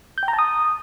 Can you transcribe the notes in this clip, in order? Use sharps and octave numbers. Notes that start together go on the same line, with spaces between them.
G6
G5
A#5
A5
D#6